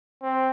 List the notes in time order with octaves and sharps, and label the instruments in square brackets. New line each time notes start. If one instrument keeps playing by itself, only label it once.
[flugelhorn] C4